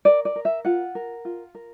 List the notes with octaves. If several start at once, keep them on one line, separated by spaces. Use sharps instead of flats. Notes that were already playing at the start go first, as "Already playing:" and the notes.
A#4 D5
D5
A#4
E5
F4 F#5
A#4
F4
A#4